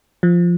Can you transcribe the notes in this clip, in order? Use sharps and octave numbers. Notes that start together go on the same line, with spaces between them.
F3